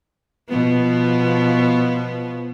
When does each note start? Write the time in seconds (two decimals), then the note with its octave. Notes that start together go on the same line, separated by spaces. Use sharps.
0.49 B2 F3 B3